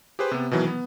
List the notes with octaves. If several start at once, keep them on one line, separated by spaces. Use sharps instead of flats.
G4 G#4 B4 C5
C3 B3
B2 D#3 E3 F#3
B3